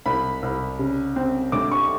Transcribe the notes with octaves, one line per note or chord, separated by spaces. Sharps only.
C2 B5
C2
C#3
C4
D2 D6
C#6